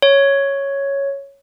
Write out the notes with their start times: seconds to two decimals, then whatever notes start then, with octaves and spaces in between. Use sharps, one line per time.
0.02 C#5